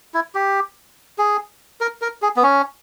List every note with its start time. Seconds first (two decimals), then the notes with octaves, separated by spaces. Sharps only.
0.14 E4
0.35 G4
1.18 G#4
1.81 A#4
2.02 A#4
2.22 G#4
2.36 B3
2.43 C#4